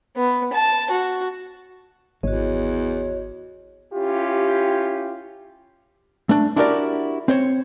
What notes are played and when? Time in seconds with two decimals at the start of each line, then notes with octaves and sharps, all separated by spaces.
0.16 B3
0.53 A5
0.91 F#4
2.23 G#1 E2 F#4 C#5 D#5
3.94 C#4 E4 F4 G4
6.29 A3 D4
6.56 D4 E4 F#4 G4 A#4 D5
7.28 C4 C5 C#5